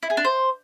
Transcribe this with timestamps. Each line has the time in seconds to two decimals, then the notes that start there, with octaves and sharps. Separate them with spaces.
0.03 E4
0.10 G#4
0.17 D4
0.25 C5